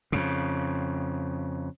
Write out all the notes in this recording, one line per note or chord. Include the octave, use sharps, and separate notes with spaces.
F2 C#3